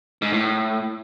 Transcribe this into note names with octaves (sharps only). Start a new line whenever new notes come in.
G#2
A2